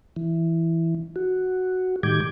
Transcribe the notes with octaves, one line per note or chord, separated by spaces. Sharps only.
E3
F#4
A2 D#3 G3 D6 G6 G#6